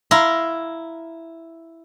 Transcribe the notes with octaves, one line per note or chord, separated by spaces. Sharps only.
E4 F5 A#5 C6